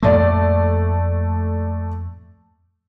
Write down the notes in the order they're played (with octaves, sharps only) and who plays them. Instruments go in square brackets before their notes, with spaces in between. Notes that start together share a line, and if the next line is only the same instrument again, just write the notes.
[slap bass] F2 A2 A#3 [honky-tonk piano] A3 D5